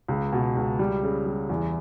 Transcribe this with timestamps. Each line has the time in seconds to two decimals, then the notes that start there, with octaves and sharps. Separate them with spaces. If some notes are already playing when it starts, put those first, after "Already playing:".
0.08 C#2
0.32 B2
0.56 C#2
0.79 G3
1.03 C#3
1.26 G3
1.49 E2